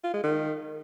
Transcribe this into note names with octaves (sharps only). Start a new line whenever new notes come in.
F4
G#3
D#3